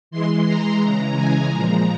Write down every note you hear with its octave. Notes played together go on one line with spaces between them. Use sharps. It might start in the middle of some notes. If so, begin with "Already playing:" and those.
E3 G#3 C6
A#5
C#3 E3 G#3
G#5
A#2 F3 G#3 A#5